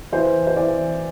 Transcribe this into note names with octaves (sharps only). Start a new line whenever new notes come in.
E3 C5
C5
E3 D5